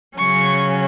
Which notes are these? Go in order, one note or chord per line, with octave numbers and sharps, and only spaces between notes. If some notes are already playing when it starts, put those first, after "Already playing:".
C#3 F#3 C#4 C#6